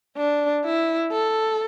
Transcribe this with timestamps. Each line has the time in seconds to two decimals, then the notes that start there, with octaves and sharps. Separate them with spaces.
0.17 D4
0.65 E4
1.12 A4